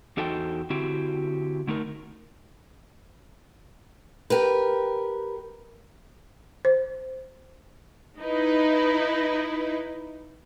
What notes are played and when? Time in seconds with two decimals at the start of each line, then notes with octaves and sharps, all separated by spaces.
0.17 E2 D#4 F#4 A4 C5 G5
0.70 D3 C4 E4 F#4 G4
1.67 D3 A3 D#4 A#4
4.30 G4 A#4 B4
6.65 C5
8.21 D#4 E4 B4